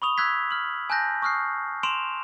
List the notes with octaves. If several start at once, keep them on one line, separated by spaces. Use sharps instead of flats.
B5 C#6 D#6 F7 G7
E6 F#6 G#6 B6
F6 F#7
G#5 A5 F#6 G6 A#6
C#6 D#6 F6 F#6 C7
C6 D7 E7 F7